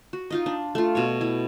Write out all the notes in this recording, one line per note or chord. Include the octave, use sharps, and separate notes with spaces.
F#4
D#4 F4 D#5
D4
A3 F4
B2 F#4 C#5
E4